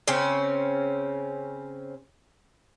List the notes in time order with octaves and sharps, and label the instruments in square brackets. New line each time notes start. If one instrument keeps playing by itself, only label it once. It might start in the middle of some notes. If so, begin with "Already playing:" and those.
[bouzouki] C#3 C4 C#4